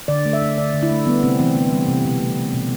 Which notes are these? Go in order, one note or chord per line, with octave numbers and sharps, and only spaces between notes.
D3 D5
A3
E5
A3
D3 D5
D3
E4
A3
G3 B3
C3 C4
E3 C4
C3 B3
G3
C3
B2
A3
A3
B2